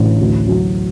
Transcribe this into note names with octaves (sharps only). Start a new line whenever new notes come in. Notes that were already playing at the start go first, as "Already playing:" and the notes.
Already playing: A1 D3
D2
F#3